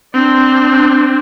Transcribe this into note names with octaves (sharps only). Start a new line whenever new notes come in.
C4 D4